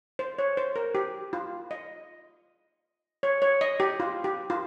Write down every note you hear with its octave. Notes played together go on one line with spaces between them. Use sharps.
C5
C#5
C5
A#4
G4
F4
D#5
C#5
C#5
D#5
G4
F4
G4
F4